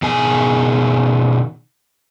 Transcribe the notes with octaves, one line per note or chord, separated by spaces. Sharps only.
B2 D#3 G#4 G#5